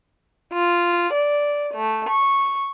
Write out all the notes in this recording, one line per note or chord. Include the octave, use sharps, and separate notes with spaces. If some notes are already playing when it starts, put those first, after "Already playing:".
F4
D5
A3
C#6